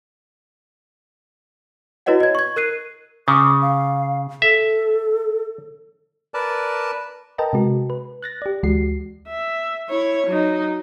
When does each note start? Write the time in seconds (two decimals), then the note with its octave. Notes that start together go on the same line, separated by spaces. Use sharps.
2.06 E4 F#4 B4 C#5 D#5 F#5
2.20 D#5 G#6
2.35 C#6 G#6
2.56 A#4 F#6 C7 D#7
3.28 C#3 D6
3.62 F5
4.42 A4 E5
6.34 A#4 B4 D5 A5
7.38 A#4 B4 D#5 G5 A5 A#5
7.53 C3 G#3 F#4
7.90 B4
8.23 F#6 A6 A#6
8.42 G4 D5
8.63 D2 E3 G#3 F#4 C7
9.28 E5
9.89 E4 C#5
10.27 F#3 D#4